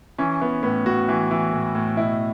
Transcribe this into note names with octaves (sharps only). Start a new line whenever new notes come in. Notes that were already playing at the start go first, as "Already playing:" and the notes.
E3 C#4
E3 B3
A2 B3
A2 F#4
E3
E3
A2
A2
B2 E4